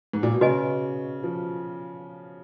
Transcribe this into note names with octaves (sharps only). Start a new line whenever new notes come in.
G#2
A#2
B2
C#3 F#4 B4 D#5 G#5
F3